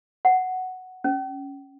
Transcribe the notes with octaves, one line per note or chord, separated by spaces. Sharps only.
F#5
C#4